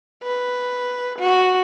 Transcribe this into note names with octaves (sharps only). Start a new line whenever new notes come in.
B4
F#4